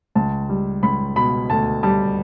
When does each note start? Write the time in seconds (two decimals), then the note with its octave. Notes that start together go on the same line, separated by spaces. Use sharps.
0.15 C#2 A5
0.49 G3
0.83 C#2 B5
1.16 B2 B5
1.50 D2 A5
1.83 G3 A5